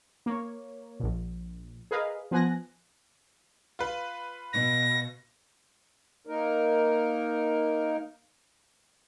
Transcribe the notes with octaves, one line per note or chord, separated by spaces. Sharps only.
A#3 C#5
A#1 A#2
G#4 A#4 B4 D#5 F5
F3 B3 G#5 F#6 A#6
F4 B4
B2 A#6
A#3 D#4 A#4